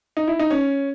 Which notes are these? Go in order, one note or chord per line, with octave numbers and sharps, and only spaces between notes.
D#4
E4
D#4
C#4